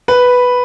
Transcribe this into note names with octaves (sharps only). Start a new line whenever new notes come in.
B4